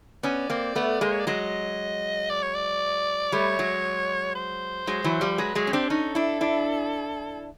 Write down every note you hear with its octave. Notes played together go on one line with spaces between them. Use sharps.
B3 C#4 D5
A#3 C4
A3 B3
G#3 A#3 C5
C#5
D5
F#3 G#3 D#5
D5
C#5
D5
G3 A3 C#5
F#3 G#3
C5
F#3 G#3
E3 F#3
F3 G3
F#3 G#3 B4
F#3 G#3 G#4
C#4
C4 D4 G4
C#4 D#4 A4
D4 E4
D4 E4